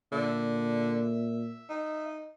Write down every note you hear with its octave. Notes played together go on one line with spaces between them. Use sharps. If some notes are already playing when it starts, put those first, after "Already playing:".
A#2 D3 E5
D#4